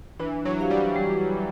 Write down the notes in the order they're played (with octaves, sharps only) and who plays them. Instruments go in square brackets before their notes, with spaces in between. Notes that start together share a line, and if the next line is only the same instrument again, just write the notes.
[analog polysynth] E3 [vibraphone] D4
[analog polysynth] F#3
[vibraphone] G4 C5 F5
[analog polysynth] G3
[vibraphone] G3